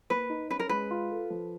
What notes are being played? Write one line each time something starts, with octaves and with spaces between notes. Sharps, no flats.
A#3 B4
D#4
C#4 B4
A#4
G#3 B4
F4
A4
F3